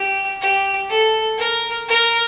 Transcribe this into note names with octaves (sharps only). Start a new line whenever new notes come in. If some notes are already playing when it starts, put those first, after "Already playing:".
Already playing: G4
G4
A4
A#4
A#4